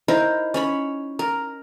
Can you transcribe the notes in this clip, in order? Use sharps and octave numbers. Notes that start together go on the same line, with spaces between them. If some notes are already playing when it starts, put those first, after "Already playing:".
D#4 E4 A#4 C5
C#4 C#5 B5
A#4